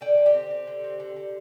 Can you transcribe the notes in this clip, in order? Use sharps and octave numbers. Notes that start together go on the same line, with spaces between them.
D3 D5 G5
D3
G4
C4
C4
D3
C4
D3
D3